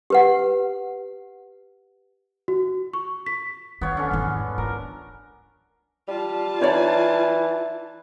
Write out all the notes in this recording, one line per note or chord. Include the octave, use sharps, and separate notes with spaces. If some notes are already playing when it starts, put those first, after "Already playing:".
G4 B4 F#5
F#4
C#6
B6
D#3 B3 C#5 F5
D3 C#4
E2 G#2
F4 A#4
G3 F4 A5
E3 D#4 C#5 D5